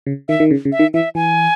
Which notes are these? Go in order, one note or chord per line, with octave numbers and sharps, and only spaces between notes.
C#3
D#3 E5
D#3
C#3
C#3
E5
D#3
E3 E5
E3 G#5